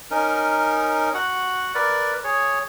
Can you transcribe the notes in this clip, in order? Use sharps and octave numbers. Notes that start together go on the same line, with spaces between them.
C#4 D#4 A#4
F#4 F#5
A#4 B4 D5
G#4 C#5